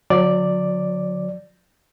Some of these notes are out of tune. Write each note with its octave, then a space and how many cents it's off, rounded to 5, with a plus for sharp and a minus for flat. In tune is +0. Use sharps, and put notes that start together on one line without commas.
D3 -5 F#3 -30 D5 +0